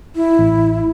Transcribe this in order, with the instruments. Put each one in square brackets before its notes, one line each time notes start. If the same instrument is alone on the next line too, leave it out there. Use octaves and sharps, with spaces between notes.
[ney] E4
[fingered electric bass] A1